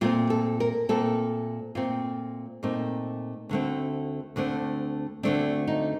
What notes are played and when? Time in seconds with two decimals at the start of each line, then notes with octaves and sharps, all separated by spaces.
0.01 A#2 A3 C4 F4
0.30 A4
0.60 A#4
0.89 A#2 A3 C4 A4
1.75 A#2 A3 C4 F4
2.63 A#2 A3 C4 D#4
3.49 D2 D3 A3 C4
4.36 D2 D3 A3 C4
5.23 D2 D3 A3 C4 D4
5.67 D#4